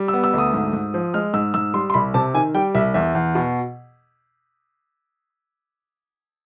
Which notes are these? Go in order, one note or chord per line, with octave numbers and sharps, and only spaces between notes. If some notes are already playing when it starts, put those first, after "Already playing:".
Already playing: G3
E6
B3
E6
D2 D#6
G#2
G#2
F3
G#3 F6
G#2 E6
G#2 E6
G3 C6
C6
C2 B5
C3 A5
D#3 G#5
G3 G5
C2 E5
E2 E5
E2
B2